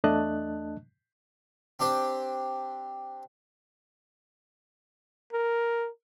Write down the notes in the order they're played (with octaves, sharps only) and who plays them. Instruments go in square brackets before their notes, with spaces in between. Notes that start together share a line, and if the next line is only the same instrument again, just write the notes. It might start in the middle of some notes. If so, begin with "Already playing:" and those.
[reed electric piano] E2 A3 D4 D#5 A5 F#6
[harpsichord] C4 D4 G4 C5
[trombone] A#4